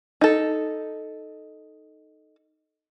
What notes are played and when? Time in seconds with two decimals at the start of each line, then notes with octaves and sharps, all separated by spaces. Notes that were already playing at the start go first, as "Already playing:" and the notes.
0.21 D#4 A4